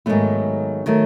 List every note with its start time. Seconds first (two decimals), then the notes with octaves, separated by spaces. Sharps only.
0.06 G#2 D#3 F#3 A3 B3
0.86 D#3 F#3 A3